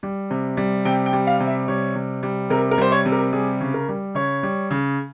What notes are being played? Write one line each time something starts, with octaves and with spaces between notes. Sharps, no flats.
G3
C3
G3
C3 G5
G5
G3
F5
C3
E5
G3 C#5
C3
G3
C3 A#4
A#4
G3 C5
C#5
C3
A#4
G3 G#4
C#3
A#4
G3
C#3 C#5
G3
C#3